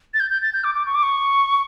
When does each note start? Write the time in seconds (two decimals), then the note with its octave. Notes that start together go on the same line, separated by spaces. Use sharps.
0.14 A6
0.20 G6
0.31 G6
0.42 A6
0.54 G6
0.64 D6
0.75 D6
0.86 C#6
0.95 D6
1.03 C#6